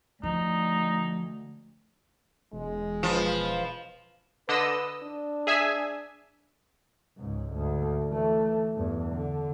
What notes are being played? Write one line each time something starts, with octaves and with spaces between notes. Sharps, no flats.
D2 F3 D#4
E1 G#3
F3 B4
D3 B4 D#5 E6
D4
G#4 E5 G#5
C#2 G#2
D2
E3 A3
E2 G2
D3